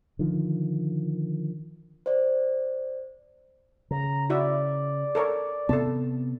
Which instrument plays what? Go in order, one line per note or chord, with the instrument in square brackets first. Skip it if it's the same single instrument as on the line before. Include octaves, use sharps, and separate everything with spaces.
[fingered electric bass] D3 D#3 F3
[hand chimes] C5 D5
[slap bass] C#3 [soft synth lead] A#5
[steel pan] E4 F#4 E5 [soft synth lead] D5
[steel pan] A4 A#4 C#5
[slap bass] C3 B3 [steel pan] A4 A5